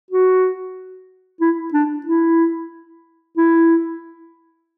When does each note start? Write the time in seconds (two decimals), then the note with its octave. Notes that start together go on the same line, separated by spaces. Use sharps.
0.11 F#4
1.41 E4
1.73 D4
2.06 E4
3.37 E4